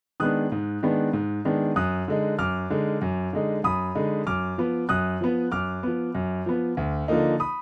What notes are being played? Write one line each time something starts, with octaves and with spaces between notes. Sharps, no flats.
D#3 G#3 B3 D4 D#6 F#6
G#2
D#3 G#3 B3 D4
G#2
D#3 G#3 B3 D4
F#2 D#6 F#6
D3 G#3 D#4
F#2 D6 F6
D3 G#3 D#4
F#2
D3 G#3 D#4
F#2 B5 D#6
D3 G#3 D#4
F#2 D6 F6
F3 B3
F#2 D#6 F#6
F3 B3
F#2 D6 F6
F3 B3
F#2
F3 B3
D2
D3 F3 A#3 D#4
B5 D#6